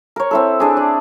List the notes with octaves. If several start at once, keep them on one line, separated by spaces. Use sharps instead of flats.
A#4 C#5
C4 E4 A4
D4 G#4
D5